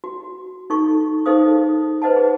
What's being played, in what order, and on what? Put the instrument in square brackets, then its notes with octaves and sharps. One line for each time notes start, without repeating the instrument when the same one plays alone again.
[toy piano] F#4
D#4 A4 C#6
D#4 G#4 A4 C5 F5 D#6
B4 C5 D#5 F#5 A5
G#4